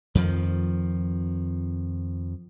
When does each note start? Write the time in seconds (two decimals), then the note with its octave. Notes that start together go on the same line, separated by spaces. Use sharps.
0.15 F2 D#3 F3